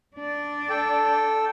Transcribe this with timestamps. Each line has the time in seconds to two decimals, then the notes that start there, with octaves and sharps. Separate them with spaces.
0.17 D4 D5
0.70 A4 G5